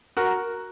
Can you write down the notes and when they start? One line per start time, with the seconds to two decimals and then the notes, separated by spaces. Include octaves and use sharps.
0.17 F#4 A#4